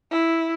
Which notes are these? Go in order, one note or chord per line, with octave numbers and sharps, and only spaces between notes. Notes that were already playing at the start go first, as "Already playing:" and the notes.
E4